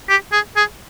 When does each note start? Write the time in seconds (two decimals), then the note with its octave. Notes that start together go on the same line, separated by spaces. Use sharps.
0.09 G4
0.32 G#4
0.56 G#4